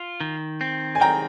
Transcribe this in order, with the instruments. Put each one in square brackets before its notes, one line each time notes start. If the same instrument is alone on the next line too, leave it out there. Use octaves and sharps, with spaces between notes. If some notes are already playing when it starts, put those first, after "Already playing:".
Already playing: [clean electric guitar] F4
D#3
C4
[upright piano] G#5
[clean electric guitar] D#3 [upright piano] G5 A#5